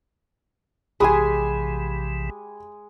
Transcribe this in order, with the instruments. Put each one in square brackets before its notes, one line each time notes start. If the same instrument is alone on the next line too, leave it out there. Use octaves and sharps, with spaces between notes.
[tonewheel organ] A#1 C3 E3 [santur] G#3 G#5 [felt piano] G4 B5 [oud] G#4